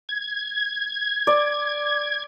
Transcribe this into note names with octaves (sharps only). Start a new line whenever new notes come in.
G#6
D5